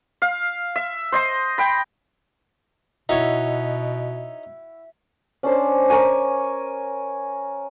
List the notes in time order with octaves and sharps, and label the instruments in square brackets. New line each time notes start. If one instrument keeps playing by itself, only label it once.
[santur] F5
E5
C5 D#5 C6
G5 B5
[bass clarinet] B2 [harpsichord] D#4 C#5 [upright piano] E4 F#4 [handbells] E5
[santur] C#4 D4 C5
A#4 C#5 G#5